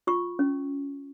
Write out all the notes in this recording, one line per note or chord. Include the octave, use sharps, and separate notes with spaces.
F4 C#6
C#4